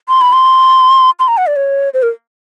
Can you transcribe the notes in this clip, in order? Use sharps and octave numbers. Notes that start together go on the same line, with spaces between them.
C6
B5
C6
C6
A#5
F#5
D5
C#5
C5
A#4